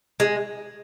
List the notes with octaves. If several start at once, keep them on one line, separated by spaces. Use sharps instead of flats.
G#3